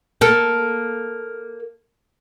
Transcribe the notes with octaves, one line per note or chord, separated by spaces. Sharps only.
A#3 A4